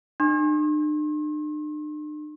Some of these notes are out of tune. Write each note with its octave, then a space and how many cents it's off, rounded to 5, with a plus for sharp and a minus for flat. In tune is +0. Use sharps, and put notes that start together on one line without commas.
D4 +45 C6 +45